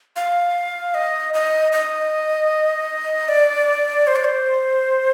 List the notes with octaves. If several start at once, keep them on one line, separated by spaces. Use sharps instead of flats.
F5
D#5
D#5
D#5
D5
C5
D5
C5